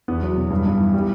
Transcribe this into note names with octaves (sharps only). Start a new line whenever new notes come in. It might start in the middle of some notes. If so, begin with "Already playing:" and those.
E2 B3
F#3
B2
G2
G2
E3
G3